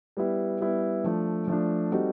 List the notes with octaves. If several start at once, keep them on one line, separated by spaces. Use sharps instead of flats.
G3 B3 E4
G3 B3 E4
F3 A3 D4
F3 A3 D4
G3 C4 D#4 F#4 A4